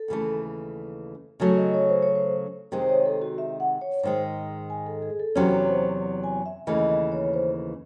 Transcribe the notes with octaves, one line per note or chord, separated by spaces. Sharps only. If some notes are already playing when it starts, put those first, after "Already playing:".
Already playing: A4
D#2 C#3 E3 A3
C#3 F#3 A3 C#5
D#5
C#5
C5
C#5
C5
C3 D#3 G#3 C5
C5
C#5
A4
F#4
E5
F#5
C#5
G#2 D#3 G#3 C5
D#5
G#5
A4
G#4
A4
E2 C3 F#3 C#4 C5
C#5
C5
G#5
E5
D#2 C#3 E3 A3 D#5
D#5
C#5
C5